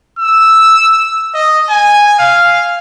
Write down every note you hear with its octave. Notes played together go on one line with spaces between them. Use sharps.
E6
D#5
G#5
F5